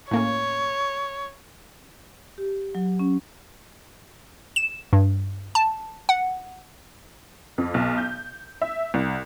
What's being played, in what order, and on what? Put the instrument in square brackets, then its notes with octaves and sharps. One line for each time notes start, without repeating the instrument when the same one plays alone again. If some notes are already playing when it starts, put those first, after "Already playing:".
[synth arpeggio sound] A2 A#3 C#4 [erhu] C#5
[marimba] G4
F#3
C#4
[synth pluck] E7
G2
A5
F#5
[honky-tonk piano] F2
B1
G6
E5
C2